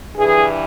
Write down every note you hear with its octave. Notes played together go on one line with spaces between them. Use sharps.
G2 E3 G#4